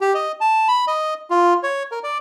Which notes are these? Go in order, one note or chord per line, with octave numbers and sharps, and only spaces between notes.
G4
D#5
A5
B5
D#5
F4
C#5
A#4
D5